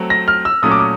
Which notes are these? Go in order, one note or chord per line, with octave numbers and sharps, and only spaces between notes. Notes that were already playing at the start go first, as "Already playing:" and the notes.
Already playing: F#3 A3 C4
A#6
F6
E6
A#2 F#3 A3 C#4 D#6
D6
D#6